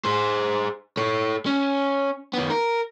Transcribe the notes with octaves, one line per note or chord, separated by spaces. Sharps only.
G#4 C5
A4 C#5
C#4
D#3 B3
A#4